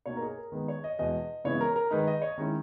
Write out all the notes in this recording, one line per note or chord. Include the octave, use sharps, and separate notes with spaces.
B2 A#3 D#4 C#5
A#4
G#4
A#4
D#3 G#3 B3 B4
C#5
D#5
E2 B2 G#3 D#5
C#3 E3 G#3 B3 E4 C#5
A#4
A#4
D#3 G#3 D#4 B4
D#5
C#5
D#3 G#3 C#4 E4